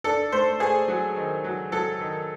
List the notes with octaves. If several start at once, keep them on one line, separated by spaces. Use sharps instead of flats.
D4 A4
A3 C5
A3 G#4
F#3
D#3
F#3
F#3 A4
D#3